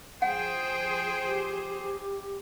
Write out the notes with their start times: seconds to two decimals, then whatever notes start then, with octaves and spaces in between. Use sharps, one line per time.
0.22 F3 G#4 C5 F#5 G5
1.27 G4